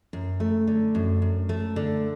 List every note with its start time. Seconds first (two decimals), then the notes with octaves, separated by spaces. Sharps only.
0.13 F#2
0.40 A3
0.67 D3
0.95 F#2
1.22 F#2
1.49 A3
1.76 D3